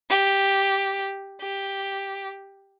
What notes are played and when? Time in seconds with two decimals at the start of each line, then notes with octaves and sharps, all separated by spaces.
0.10 G4
1.41 G4